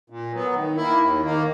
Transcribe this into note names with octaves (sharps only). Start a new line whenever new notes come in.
A#2
F#3 B3
D#3
E4
A#3
D#2
D#3 A#3